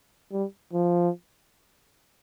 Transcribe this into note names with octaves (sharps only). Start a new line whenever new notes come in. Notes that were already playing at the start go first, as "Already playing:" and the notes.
G3
F3